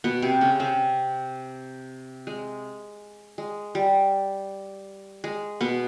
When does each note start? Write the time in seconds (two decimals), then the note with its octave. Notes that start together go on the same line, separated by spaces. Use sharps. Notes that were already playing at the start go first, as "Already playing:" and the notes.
0.04 B2 B3
0.22 C3 C4
0.41 C#3 C#4
0.60 C3 C4
2.27 G#3
3.38 G#3
3.75 G3
5.24 G#3
5.61 B2 B3